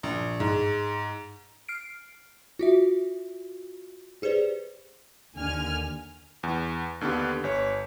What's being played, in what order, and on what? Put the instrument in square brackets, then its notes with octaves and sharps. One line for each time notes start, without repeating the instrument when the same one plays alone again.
[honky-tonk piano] A#1
G#2
[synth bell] F6 C7 D7
F4 F#4 E5
G4 G#4 B4 C5 D5
[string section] D#2 D3 G#5 F6
[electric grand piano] E2
D#2 D3 B3 G4
G1 C#5